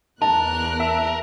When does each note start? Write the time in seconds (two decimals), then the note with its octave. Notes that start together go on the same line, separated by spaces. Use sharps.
0.22 E2 A#4 A5 F#6
0.80 E5